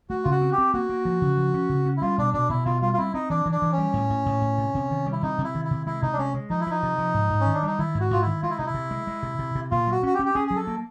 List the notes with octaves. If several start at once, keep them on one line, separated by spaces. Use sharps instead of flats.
A3 F#4
C#3 F4
F#4
C4
G4
C4
A#3 F#4
A#3
F3
C#3
F3
C#4
C#3
C#4
E4
G3 F4
B2 D4
B2 D4
B2 E4
B2 F4
G3 F4
F4
C4 E4
C4 D#4
E3 D4
E3
D4
E3
C#4
G3
A2
A2
A2
A2
C3
C3
D#3
G3
E4
C3 D#4
C3
E4
D#3
E4
C3
G#3 E4
C3 D#4
D4
G#3 C#4
G#3
F3 D#4
E4
F3 D#4
C3
F3
G#2
G#2
C#4
D#3
D4
G3 D#4
D#3 E4
G#2
F#4
G#2 F4
D#3 E4
G#3 F4
E4
C3 D#4
E4
C3
G#3
G#3
C3
C3
C3
A#2 F4
F#3 F#4
C#4 F#4
G4
C#4
G4
C#4 G#4
F#3 G#4
A4
A#3